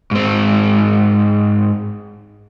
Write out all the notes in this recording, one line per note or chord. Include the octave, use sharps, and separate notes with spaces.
G#2 C4